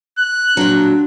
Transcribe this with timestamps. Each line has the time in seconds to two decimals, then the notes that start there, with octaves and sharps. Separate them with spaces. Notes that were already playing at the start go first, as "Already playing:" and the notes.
0.19 F#6
0.57 A#2 F#3 D4